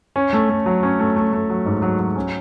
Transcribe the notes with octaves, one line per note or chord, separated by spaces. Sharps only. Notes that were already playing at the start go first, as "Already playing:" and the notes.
C#4
A3
A3
F#3
C#4
A3
A3
A3
F#3
G#2
F#3
F#3
C#4